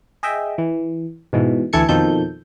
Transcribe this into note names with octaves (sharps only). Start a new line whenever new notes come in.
G#4 D#5 E5 G5
E3
G#2 B2 E3
D2 E3 A4 G#6 C#7
F2 B2 D#3 F3 A4 G6